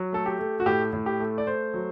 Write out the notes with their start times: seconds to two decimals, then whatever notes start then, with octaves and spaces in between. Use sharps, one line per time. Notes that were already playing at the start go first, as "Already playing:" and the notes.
Already playing: F#3
0.13 A3 A4
0.26 G4
0.39 A3
0.60 F#4
0.66 A2 G4
0.93 A2
1.06 G4
1.20 A3
1.38 D5
1.47 A3 C5
1.74 F#3